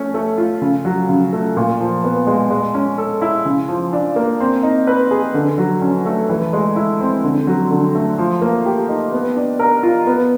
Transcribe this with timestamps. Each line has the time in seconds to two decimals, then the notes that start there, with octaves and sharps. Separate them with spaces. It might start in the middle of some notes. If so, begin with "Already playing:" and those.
Already playing: A3 C#4
0.14 A3
0.38 F4
0.62 C#3
0.85 F#3
1.09 C#3
1.33 A3
1.57 A#2
1.80 F3
2.04 B3
2.27 G#3
2.50 G#3
2.74 C#4
2.98 A4
3.22 E4
3.45 C#3
3.68 F3
3.93 D4
4.16 A#3
4.40 C4
4.63 D#4
4.87 B4
5.11 G#4
5.34 D3
5.58 F#3
5.82 C#4
6.06 A3
6.29 E3
6.53 G#3
6.76 E4
7.00 C4
7.24 D3
7.47 F#3
7.71 D3
7.95 A3
8.18 F3
8.42 A#3
8.66 G4
8.89 D#4
9.12 B3
9.36 D4
9.59 A#4
9.83 F4
10.07 B3